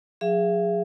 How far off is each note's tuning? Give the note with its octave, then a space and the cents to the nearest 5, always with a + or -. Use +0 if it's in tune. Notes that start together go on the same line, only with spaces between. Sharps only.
F#3 -35 G#4 -10 E5 +35